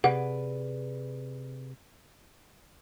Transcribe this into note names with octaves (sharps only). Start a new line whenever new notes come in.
C3 G#4 B4 D5 F#5